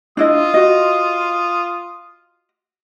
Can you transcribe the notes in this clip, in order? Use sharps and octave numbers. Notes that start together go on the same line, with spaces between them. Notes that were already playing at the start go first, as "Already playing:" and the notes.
D4 E4 F4 D#5 D#6
F#4 D#5